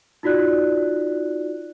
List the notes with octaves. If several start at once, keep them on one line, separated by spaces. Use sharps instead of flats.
D#4 F4 F#4 D5 F#6